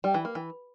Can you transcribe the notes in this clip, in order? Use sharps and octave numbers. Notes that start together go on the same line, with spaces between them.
G3
E3
A#3
E3